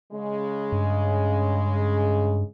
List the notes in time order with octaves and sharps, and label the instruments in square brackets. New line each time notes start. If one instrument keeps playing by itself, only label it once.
[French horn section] C#3 G#3
[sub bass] G2